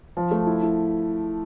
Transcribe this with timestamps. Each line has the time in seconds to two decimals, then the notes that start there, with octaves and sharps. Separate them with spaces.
0.17 F3
0.31 A3
0.47 E4
0.62 E4